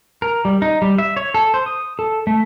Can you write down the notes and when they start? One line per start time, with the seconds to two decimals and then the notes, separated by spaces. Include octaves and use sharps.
0.22 A#4
0.45 G3
0.62 D#4
0.82 G3
0.98 E5
1.17 C#5
1.34 A4
1.54 C5
1.66 D#6
1.99 A4
2.27 A3